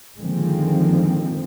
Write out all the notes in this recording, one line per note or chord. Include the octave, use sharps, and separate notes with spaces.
D3 D#3 F3 G#3 A#3 C4